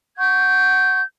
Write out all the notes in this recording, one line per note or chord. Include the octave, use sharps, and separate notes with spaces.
F#5 C#6 G6 G#6